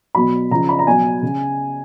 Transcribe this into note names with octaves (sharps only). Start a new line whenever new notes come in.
B2 F#3 B5
C#3 F3 A#5
B5
A#5
B2 F#3 G#5
C#3